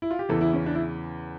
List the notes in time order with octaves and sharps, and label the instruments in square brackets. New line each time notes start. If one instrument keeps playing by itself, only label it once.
[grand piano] E4
F4
G4
[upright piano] E2 C#3 E3 [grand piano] A4
[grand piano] E4
C#4
D4
E4